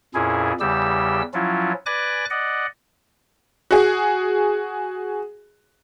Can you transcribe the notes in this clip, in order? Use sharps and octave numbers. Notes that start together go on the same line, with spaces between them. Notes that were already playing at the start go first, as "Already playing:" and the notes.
F2 A#2 C#4 E4 G#4
E2 C#3 G3 G4 E6
F3 F#3 C#4 E4 F4
B4 D5 G#5 D6 F#6 A#6
D5 D#5 F#5
F#4 G#4